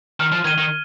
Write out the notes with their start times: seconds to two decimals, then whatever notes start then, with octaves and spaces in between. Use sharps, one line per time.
0.20 D#3 F6
0.32 F3
0.45 D#3 G#6 D#7 G7
0.58 D#3